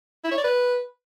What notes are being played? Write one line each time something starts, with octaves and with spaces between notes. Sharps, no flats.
E4
C#5
D5
B4